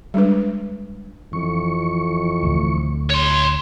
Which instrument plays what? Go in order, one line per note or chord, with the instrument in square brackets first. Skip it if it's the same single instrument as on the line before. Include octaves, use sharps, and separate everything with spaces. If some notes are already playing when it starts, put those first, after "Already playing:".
[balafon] G3 G#3 D4 B4
[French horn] F2 [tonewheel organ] E3 C#6
[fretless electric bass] D2 A2
[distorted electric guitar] C#5 C6